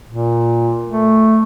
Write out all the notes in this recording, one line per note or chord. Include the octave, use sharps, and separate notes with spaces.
A#2
A3